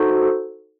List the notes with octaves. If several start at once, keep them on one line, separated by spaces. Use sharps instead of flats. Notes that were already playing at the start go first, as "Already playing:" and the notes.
Already playing: D#4 F#4 A4 C5